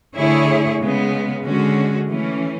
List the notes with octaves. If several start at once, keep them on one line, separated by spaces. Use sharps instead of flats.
D3 A3 E4 G#4 C#5
C#3 G#3 B3
D3 G#3 C#4 F#4
E3 A3 C#4